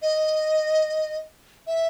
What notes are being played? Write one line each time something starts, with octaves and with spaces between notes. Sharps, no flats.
D#5
E5